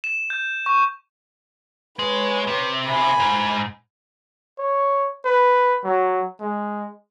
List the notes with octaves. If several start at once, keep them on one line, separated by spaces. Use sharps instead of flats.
E7
G6
C#6
G#3 B4 C#5
C3
G#5 B5
G#2
C#5
B4
F#3
G#3